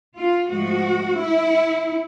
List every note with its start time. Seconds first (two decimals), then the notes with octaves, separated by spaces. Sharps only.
0.15 F4
0.50 G#2 F3 A3 F#4
1.19 E4